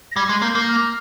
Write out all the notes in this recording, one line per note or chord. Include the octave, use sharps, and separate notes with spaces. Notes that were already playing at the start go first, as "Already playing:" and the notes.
A#6
G3 G#6
G#3
A#3 G6
A#3
F6